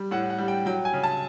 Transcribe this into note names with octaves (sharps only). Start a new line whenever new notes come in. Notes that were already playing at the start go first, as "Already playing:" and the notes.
Already playing: G3
A2 F#5
F#5
G3
G5
F#3 G5
G#5
C#3
A5